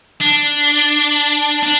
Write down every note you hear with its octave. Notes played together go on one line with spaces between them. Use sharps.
D4
D4